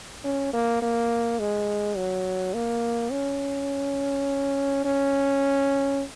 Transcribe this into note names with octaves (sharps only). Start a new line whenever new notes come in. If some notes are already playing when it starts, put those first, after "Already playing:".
C#4
A#3
A#3
G#3
F#3
A#3
C#4
C#4